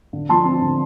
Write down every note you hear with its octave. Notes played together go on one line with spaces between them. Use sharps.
D3
F3 A5 C6
C4
D3